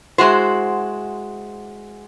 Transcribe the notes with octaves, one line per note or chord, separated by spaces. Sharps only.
G#3 E4 F#4 C5